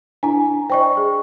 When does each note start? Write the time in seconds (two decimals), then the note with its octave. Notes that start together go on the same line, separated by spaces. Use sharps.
0.23 D4 E4 G#5 A#5
0.70 C5 D5 D#5 G5 C#6
0.97 G#4